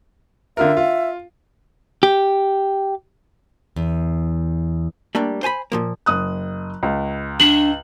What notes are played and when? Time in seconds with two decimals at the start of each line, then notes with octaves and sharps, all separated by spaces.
0.57 D3 F4 A#4 E5
0.77 F4
2.03 G4
3.76 E2
5.15 G3 A3 A#3 D4
5.43 C5 G#5 A5 B5
5.72 A#2 F3 A#3
6.06 F#1 D#6 F#6
6.83 C#2
7.40 D4 F#7